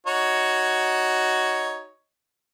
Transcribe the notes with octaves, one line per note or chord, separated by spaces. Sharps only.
D#4 F#4 C#5